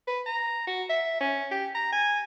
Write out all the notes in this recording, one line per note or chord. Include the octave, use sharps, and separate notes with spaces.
B4
A#5
F#4
E5
C#4
G4
A#5
G#5